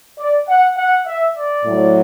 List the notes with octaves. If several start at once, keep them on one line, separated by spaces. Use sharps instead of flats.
D5
F#5
F#5
E5
D5
A2 F#3